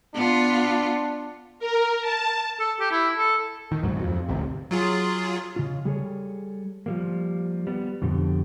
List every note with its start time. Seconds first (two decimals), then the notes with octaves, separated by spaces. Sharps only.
0.15 B3 D4 F4
1.59 A#4
2.01 A5
2.60 A4
2.80 G4
2.91 E4
3.18 A4
3.72 D#3
3.83 D#2 G#2 F#3
3.99 F2
4.29 G#1 D2 C3
4.71 F#3 F4 G#4
5.56 C#3 F4
5.85 G3 G#4 A4 C#5
6.86 F3 G3 A#3
7.67 G3 B3
8.02 F2 B2 D3 G4